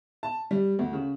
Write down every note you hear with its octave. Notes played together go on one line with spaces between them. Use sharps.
A5
G3
D2
C#3